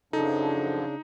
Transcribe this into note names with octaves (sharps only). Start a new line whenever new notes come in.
F#2 C#3 F3 F#3 D4 D#4 A4